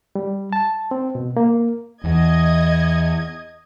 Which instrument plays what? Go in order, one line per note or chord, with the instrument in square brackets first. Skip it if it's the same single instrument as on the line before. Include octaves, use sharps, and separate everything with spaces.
[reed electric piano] G3
A5
C4
B2
A#3
[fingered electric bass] E2 E3 [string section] D#5 G#6